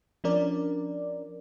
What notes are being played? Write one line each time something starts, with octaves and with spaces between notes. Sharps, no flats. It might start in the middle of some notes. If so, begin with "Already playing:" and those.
F3 C#4 D4 A#4 D5